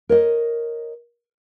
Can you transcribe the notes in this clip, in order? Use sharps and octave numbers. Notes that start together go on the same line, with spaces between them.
A#4 C#5 D#5